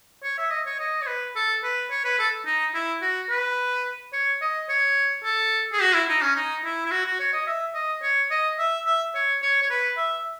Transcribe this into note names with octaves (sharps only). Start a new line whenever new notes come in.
C#5
E5
D#5
C#5
D#5
C#5
B4
A4
B4
C#5
B4
A4
D#4
E4
F#4
B4
C#5
D#5
C#5
A4
G#4
F#4
E4
D#4
C#4
D#4
E4
E4
F#4
F#4
C#5
D#5
E5
D#5
C#5
D#5
E5
E5
C#5
C#5
C#5
B4
E5